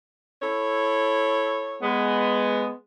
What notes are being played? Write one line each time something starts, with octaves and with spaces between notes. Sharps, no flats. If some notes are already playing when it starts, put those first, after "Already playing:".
E4 A4 C#5
G#3 B3